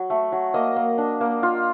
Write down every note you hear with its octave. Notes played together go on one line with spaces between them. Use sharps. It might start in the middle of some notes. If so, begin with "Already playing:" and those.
Already playing: F#3
A3
F#3
A#3 D#5
A#3
D4
A#3
F4